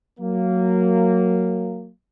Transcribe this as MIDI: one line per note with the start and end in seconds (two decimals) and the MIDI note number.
0.20 1.90 54
0.20 1.90 58